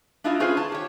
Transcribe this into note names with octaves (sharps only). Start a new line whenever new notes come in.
D4 E4 F4 D#5 A5
C#4 F4 G#4 B4 C5
A5
G4 C#5